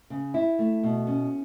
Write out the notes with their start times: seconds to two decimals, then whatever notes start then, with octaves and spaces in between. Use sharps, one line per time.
0.10 C#3
0.34 E4
0.59 A3
0.83 B2
1.07 C#4